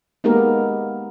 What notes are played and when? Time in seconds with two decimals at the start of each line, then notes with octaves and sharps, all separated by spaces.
0.24 G#3 A#3 B3 D#4 G4 A#4